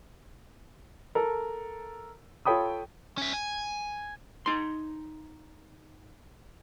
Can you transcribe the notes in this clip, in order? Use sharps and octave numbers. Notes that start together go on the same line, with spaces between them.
A4 A#4
F4 A4 C#5 G5 B5 D#6
C#4 E5
G#5
D#4 C6